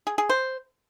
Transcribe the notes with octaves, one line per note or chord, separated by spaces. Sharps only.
G#4
G#4
C5